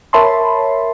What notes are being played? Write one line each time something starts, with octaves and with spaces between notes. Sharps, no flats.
A#4 C#5 E5 A5 B5 C6